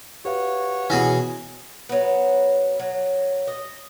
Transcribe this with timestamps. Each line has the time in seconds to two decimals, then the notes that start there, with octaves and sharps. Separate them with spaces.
0.25 F#4 G4 B4 C#5 F5
0.90 B2 E3 C#4 F#4 G#4
1.89 F#3 B3
2.80 F#3
3.47 D#5